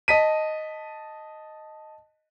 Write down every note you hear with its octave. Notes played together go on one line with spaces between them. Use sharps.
D#5 A5 B6 D#7